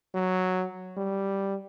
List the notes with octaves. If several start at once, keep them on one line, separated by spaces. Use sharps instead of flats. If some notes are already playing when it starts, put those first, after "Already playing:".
F#3
G3